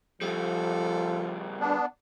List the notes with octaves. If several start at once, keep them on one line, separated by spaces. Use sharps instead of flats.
C#3 F3 G3 A4
B3 D4